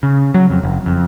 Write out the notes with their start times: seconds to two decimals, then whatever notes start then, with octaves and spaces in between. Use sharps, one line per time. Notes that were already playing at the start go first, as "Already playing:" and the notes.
0.03 C#3
0.34 F#3
0.50 F2
0.63 F#1
0.86 F2